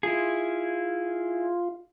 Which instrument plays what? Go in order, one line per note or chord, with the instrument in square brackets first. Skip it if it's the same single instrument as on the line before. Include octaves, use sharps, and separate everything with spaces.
[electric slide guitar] E4 G#4 [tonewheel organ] F4